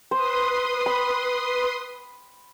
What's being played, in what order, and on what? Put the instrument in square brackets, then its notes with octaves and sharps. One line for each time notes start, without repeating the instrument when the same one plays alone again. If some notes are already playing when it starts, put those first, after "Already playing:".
[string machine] B4 C6 D#6 [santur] C5
[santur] B5